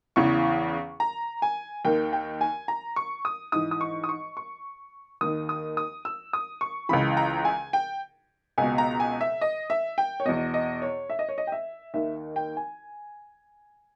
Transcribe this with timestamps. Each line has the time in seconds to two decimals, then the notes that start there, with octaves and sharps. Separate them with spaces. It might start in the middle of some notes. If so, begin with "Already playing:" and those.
0.16 E2 C#3 E3 C#6
1.00 A#5
1.42 G#5
1.85 D#2 D#3 G5
2.13 G5
2.41 G#5
2.68 A#5
2.96 C#6
3.25 D#6
3.52 G#2 E3 D#6
3.71 D#6
3.81 C#6
4.04 D#6
4.09 C#6
4.37 C#6
5.21 D#2 D#3 D#6
5.49 D#6
5.77 D#6
6.05 E6
6.33 D#6
6.61 C#6
6.89 C#2 C#3 E3 B5
7.17 A#5
7.45 G#5
7.73 G5
8.58 C#2 B2 G#5
8.78 A#5
9.00 G#5
9.21 E5
9.41 D#5
9.70 E5
9.98 G5
10.20 C#5
10.25 E2 B2 D#5
10.54 D#5
10.82 C#5
11.10 E5
11.19 D#5
11.29 C#5
11.38 D#5
11.47 G5
11.52 E5
11.94 D#2 D#3 E5
12.36 G5
12.57 G#5